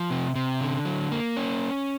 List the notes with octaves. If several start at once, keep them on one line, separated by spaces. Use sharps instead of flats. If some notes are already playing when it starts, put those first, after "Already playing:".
Already playing: F3
C3
C3
D3
F#3
A#3
C#4